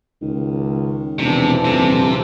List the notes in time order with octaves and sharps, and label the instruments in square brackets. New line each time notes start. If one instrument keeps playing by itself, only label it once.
[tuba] C#2 [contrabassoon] D#3
[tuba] E1 [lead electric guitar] C3 [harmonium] E3 F3 D4
[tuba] D#1 [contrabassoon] F2 [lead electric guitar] C3